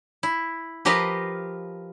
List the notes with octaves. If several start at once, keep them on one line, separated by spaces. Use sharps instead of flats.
E4
F3 G4 A#4 B4 D#5 F5